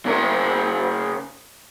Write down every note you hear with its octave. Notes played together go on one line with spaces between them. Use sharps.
C#3 A#4